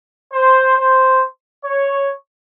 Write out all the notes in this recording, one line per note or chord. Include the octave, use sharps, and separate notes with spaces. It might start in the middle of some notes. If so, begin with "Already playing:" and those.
C5
C5
C#5